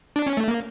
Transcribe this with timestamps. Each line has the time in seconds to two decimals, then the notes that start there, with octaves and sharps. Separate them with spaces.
0.16 D4
0.27 C#4
0.37 A3
0.48 A#3